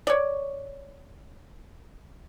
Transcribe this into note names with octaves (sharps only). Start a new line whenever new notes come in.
C#5 D5